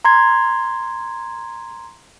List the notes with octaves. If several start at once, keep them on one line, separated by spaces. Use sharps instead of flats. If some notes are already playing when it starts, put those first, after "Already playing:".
A#5 C6 G#6